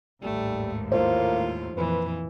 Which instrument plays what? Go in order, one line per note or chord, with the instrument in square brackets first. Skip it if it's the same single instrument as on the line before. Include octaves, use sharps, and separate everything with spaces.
[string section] A1 D#2 G#2 [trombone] G3 [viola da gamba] A3
[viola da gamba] A2 F4 [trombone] A#3 [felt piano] C5
[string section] F2 A#2 [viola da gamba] E3 [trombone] B4